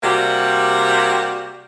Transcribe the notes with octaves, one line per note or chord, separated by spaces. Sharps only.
C3 G3 A#3 F#4 G4